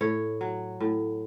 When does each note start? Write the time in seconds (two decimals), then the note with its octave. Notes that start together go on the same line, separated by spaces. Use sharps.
0.01 A2 C#5
0.41 F#3
0.80 A2